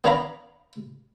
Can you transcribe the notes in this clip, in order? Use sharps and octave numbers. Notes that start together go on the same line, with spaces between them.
B3 D4 C#5 F5 A#5 B5